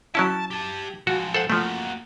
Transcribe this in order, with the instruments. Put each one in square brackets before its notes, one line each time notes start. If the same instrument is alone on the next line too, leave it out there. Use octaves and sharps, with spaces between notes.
[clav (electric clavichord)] F#3 C#4 E4 [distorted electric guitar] A5
[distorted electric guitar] G4 A5
[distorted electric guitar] F3 G#3 [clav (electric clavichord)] F#4
[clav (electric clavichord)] A4 C5 F#5
[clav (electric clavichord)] F3 A3 [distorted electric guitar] A#3 F#4